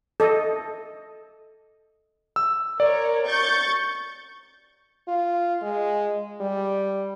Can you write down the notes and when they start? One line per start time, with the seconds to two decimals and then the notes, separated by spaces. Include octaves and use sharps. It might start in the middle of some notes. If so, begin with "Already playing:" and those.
0.20 A4 D#5
2.36 E6
2.80 A#4 C#5 D5
3.27 C#6 G6 A6
5.08 F4
5.62 G#3
6.41 G3